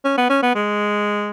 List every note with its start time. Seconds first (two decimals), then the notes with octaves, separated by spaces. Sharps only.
0.05 C#4
0.17 B3
0.30 C#4
0.43 B3
0.55 G#3